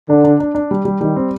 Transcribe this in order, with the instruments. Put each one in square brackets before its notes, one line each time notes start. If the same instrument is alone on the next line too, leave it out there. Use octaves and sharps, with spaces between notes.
[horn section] D3 [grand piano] D4
[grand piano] D4
D4
D4
G3
G3
[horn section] D#3 [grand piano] G3
[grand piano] C4